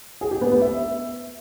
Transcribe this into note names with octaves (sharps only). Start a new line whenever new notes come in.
G#4
G4
B3
B3
E5